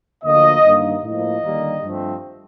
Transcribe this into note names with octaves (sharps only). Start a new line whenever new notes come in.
D2 D3 F3 A#3 D#5
G2 D#3 A#3
A2 F3 A#3 D#5
D#2 D3 G3 A#3
G2 F3 A3 C4